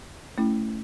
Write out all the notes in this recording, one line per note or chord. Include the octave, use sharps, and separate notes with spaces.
A3 C#4 E4